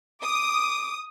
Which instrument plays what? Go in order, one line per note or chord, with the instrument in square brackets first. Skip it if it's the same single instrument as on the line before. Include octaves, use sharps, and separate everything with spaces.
[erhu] D6 [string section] D#6